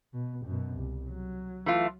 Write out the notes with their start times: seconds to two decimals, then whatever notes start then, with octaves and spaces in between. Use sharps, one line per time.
0.13 B2
0.46 F#2 B2
0.76 C2
1.09 F#3
1.66 E3 A3 F4